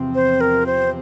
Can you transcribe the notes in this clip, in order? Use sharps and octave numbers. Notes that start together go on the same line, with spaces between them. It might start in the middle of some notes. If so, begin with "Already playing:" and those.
Already playing: E2 C3 F3 C4
C5
A#4
C5